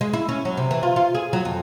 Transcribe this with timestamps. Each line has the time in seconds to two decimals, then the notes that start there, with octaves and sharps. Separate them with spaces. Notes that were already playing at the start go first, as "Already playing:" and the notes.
0.01 G#3
0.13 E4
0.29 C#4
0.45 F#3
0.57 C3
0.71 E3
0.83 F4
0.96 F4
1.15 G#4
1.33 F#3
1.45 F2